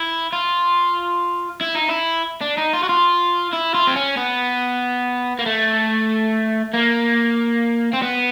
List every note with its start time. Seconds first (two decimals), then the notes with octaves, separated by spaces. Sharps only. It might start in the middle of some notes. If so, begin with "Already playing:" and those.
Already playing: E4
0.32 F4
1.61 E4
1.75 D#4
1.89 E4
2.41 D4
2.57 D#4
2.73 F4
2.83 F#4
2.89 F4
3.53 E4
3.74 F4
3.87 C4
3.96 C#4
4.17 B3
5.39 A#3
5.46 A3
6.74 A#3
7.93 C4
8.02 B3